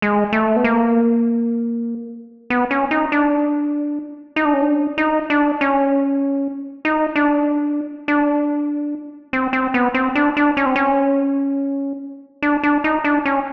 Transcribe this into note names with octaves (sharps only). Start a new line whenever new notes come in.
G#3
A3
B3
A#3
B3
C#4
D#4
D4
D#4
D4
C#4
D4
D#4
D4
C#4
D#4
D4
D4
C4
C4
B3
C4
D4
D4
C#4
C4
C#4
D4
D4
D#4
D4
C#4